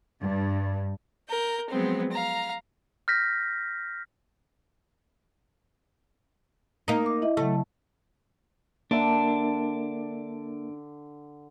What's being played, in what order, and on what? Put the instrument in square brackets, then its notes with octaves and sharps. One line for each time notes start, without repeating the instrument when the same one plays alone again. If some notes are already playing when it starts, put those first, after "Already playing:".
[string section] G2
[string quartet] A#4 G6
F3 F#3 G#3 B3 C4
F5 A#5
[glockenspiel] F6 G6 A#6 B6
[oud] A#3 D#4 [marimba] A#5
[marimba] D6
E4 D#5 E5
[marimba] C#3 F#3 [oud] A3
[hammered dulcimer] D3 A5 [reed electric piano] A#3 A#4 E5 [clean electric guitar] D4